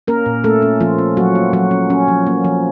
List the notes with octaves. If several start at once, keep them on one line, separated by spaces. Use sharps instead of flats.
A#3 C#4 A#4
A#2
A3 C#4 A4
C#4
F3 A#3 F4
C#4
F#3 A#3 F#4
A#3
F3 F#3 F#4
C#4
C#4
F3
A#3
F3